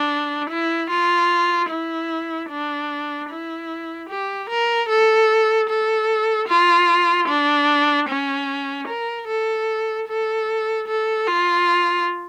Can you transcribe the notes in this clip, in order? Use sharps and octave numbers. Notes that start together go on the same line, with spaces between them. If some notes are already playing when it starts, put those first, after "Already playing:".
Already playing: D4
E4
F4
E4
D4
E4
G4
A#4
A4
A4
F4
D4
C#4
A#4
A4
A4
A4
F4